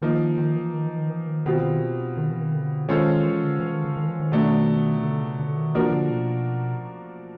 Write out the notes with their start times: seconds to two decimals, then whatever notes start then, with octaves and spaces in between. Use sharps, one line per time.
0.02 D#3 F3 A#3 D#4
0.38 D#3
0.55 E3
0.73 D#3
0.86 E3
0.98 D#3
1.09 E3
1.27 D#3
1.46 B2 D#3 G3 C4 F4
1.63 D#3
2.17 D#3
2.29 E3
2.41 D#3
2.53 D3
2.89 D#3 G#3 C#4 F4 A4 C5
3.25 E3
3.43 D3
3.60 E3
3.72 D#3
3.85 D3
3.97 D#3
4.08 E3
4.20 D#3
4.32 B2 F#3 A3 D4
5.03 D3
5.22 C#3
5.40 D3
5.56 D#3
5.75 E3 F3 A#3 D4 F#4 A#4
5.92 D3
6.10 B2